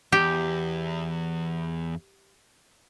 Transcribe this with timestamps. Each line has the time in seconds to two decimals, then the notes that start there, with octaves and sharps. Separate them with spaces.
0.12 E2 G4